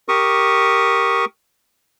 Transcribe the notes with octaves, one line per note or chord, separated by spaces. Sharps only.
G4 A#4 C#6 D#6